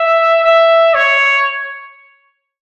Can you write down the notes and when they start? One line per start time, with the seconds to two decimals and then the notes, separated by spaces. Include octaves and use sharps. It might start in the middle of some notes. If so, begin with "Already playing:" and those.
Already playing: E5
0.44 E5
0.94 C#5